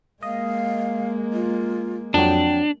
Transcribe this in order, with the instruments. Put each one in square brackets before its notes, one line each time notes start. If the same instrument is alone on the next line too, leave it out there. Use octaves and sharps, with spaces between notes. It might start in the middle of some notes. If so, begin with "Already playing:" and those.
[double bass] G#3 A#3 [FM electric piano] D#5 [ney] F5
[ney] F4
[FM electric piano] F2 F#3 [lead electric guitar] D4 [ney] G5